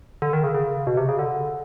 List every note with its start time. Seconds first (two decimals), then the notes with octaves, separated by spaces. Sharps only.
0.22 D3
0.33 D#3
0.43 C#3
0.54 C#3
0.87 B2
0.97 C3
1.09 C#3
1.19 D3